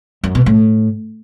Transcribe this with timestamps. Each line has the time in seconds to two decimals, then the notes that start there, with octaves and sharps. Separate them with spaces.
0.24 F#2
0.35 B2
0.46 A2